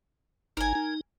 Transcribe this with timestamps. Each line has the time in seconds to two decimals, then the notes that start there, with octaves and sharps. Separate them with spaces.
0.57 G1 D#4 A#4 G#5
0.75 D#4